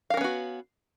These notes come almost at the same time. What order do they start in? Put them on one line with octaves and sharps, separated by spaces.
F5 A#4 C#4 B3 F#4